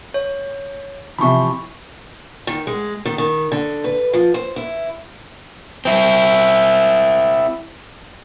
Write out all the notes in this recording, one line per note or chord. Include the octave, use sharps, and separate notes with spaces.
C#5
C3 E3 F3 B5 C#6
D#3
G#3
D#3
D#3
D3
B4
F3
C5
E4
C4 E4